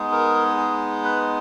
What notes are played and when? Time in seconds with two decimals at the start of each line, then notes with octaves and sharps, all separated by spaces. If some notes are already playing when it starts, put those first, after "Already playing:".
Already playing: G#3 B3 D#4 G#4
0.12 A#4
0.57 G#4
1.04 B4